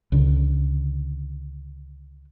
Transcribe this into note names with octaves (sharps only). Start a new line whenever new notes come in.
C#2 D3